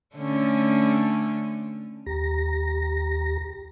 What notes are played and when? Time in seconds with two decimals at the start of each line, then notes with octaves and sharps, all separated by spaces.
0.16 D3 A3 C#4
2.06 D#2 G4 A#5 A#6